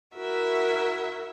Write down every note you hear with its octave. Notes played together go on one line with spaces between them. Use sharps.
E4 F#4 A#4 E5